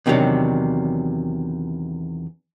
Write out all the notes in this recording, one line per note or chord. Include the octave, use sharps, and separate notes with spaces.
E2 C3 D#3 E3 F#3 D4